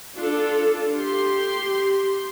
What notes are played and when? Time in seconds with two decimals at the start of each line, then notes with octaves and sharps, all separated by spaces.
0.17 D4 F4 A4
0.94 G4 C6